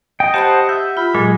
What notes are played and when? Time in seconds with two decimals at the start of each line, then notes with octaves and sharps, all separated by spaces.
0.20 D#5 G5
0.34 G4 C5 F#5 A5 B5 G6
0.69 E5 F#5 G6
0.97 F4 B5
1.15 A#2 F#3 G#3